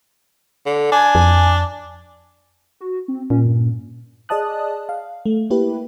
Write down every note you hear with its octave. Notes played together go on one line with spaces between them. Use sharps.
D3
D4 G#5
F2
F#4
C4
A#2 C#4
G2
G#4 D5 D#5 A5 D#6 F#6
F5
A3
A#3 E4 G4 B4